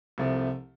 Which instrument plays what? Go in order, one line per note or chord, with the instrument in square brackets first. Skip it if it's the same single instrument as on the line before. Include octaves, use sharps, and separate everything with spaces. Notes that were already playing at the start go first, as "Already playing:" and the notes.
[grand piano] C2 C3 F3 A3